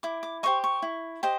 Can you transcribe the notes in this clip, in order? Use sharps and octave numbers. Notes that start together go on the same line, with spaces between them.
E4 D6
D6
G4 C5 D#5 C#6
C#6
E4
G4 C5 D#5